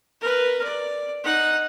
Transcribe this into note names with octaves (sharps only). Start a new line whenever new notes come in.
A#4 B4
D5
D#4 F#5